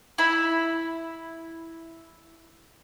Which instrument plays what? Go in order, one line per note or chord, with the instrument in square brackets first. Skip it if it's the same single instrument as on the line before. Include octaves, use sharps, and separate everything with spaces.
[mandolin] E4 B5